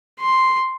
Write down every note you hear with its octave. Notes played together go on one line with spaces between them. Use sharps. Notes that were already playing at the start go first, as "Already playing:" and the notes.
C6